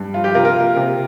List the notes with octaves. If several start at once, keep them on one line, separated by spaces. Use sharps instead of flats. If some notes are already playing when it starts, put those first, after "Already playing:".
Already playing: G2
F3 F4
G4
C3 F4 A#4
F4 A#4
A#3
C3